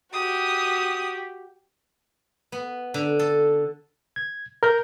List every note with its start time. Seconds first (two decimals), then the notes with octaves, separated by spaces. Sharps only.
0.13 F#4 G4 D#6
2.52 B3
2.94 D3
3.19 A4
4.16 G#6
4.63 A#4 G6